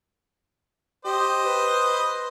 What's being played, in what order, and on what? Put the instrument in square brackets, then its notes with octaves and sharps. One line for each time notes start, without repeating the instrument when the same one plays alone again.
[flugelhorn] G4 [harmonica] C5 D#5
[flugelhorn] B4